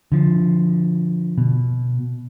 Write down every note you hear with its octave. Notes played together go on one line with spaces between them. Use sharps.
D3 F3
B2